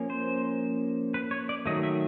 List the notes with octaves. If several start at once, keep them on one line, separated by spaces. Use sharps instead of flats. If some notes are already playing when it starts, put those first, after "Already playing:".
Already playing: F3 A#3 C#4
C5
B4
C#5
D5
D#3 F#3 A3 D#5
E5